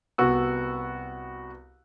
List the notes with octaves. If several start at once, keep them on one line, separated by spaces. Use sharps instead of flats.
C2 B3 F#4 E6